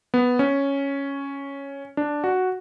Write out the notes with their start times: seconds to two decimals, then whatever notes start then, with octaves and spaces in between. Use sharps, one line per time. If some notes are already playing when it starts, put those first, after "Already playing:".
0.14 B3
0.39 C#4
1.97 D4
2.24 F#4